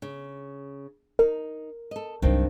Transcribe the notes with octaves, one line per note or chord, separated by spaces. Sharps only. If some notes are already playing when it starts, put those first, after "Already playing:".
C#3
D#4 A#4
A4 D#5
C2 G2 D#3 F#3 C4